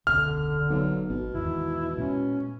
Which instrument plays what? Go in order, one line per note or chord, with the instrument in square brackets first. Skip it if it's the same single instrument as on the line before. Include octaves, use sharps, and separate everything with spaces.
[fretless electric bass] E1 C#2 B2 [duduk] D3 [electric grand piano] F6
[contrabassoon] B1
[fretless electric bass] G#1 [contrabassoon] B2
[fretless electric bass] E2 G#2 D#3 [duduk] E4
[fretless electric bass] A#2 G#3 [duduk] C#4